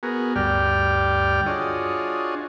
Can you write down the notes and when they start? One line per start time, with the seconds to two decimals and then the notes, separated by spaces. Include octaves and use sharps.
0.03 B3 F#4 G#4 A#4
0.35 D2 G2 G3 D5 G5 F6
1.46 D4 F4 F#4 G#4 C#5 D#5